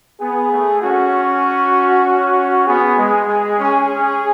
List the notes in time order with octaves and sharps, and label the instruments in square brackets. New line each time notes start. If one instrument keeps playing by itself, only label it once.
[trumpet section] B3 [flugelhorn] G#4
[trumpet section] A3
[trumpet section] C#4 [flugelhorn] F#4
[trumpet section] C#4
[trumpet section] B3 [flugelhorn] G#4
[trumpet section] G#3
G#3
C#4
C#4